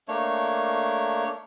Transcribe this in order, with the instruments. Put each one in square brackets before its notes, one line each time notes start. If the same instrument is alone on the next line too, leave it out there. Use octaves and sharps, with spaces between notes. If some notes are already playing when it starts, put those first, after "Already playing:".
[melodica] A3 A#3 D4 C#5